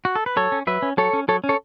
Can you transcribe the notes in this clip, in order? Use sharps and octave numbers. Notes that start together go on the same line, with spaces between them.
F#4
A4
B4
F#3 A4 C#5
C#4
F#3 B4 E5
C#4
F#3 A4 C#5
C#4
F#3 A4 C#5
C#4
A4 C#5